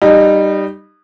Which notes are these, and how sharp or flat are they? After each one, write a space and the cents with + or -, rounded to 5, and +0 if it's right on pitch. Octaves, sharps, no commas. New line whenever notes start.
G3 +0 D#4 -20